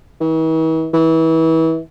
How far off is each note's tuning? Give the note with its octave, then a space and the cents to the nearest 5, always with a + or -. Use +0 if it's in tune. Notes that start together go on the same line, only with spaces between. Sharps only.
E3 -45
E3 -30